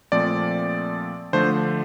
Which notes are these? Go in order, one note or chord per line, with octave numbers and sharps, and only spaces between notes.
A#2 F3 A3 C4 D5
D3 F3 A3 D4 C5